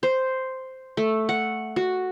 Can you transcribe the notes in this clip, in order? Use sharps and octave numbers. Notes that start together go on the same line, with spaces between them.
C5
A3
F#5
F#4